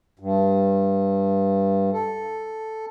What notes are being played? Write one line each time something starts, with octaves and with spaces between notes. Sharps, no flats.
G2
A4